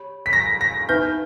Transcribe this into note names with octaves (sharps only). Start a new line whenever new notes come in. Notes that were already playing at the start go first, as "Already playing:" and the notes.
Already playing: G4 C#5 B5
B6
A#6
A#6
D#4 G4 B4 E5 G#5 G6